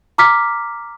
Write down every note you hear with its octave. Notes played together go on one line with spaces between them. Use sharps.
A#5 D6 F6 B6